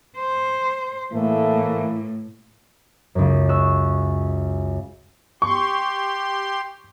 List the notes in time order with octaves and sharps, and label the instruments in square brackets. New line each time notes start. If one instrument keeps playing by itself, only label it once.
[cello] C5
[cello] A2 [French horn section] E3 A3 A#3
[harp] C#2 F#2
D#5 C#6 E6 F#6
[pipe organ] G4 C6 [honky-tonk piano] C#6